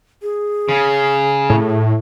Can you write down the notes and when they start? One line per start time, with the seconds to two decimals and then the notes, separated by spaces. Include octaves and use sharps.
0.22 G#4
0.69 C#3
1.50 A2